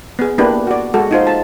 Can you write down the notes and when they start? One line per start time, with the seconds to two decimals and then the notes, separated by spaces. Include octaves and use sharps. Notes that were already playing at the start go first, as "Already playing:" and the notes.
0.19 B3 G#4
0.38 A#3 B3 D4 E4 G4 B4
0.67 F#4 D5
0.94 G#3 F#4 A4
1.11 D#4 F4 C5
1.27 A5